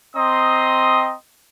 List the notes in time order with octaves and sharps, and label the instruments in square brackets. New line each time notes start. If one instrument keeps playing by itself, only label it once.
[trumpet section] C4 D#5 G5 A#5 C6 D#6